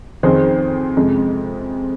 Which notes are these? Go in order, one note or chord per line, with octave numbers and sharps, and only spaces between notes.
F2 D#3 C4 G#4 C5
F2 C3 G#3